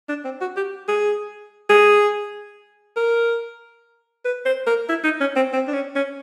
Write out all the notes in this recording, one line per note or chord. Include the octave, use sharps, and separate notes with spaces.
D4
C4
F#4
G4
G#4
G#4
A#4
B4
C5
A#4
E4
D#4
C#4
C4
C4
D4
C#4
C#4